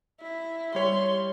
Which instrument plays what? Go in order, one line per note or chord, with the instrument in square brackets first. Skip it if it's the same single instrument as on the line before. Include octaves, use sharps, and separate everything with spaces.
[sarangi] E4
[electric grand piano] G3 C#5 [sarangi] C6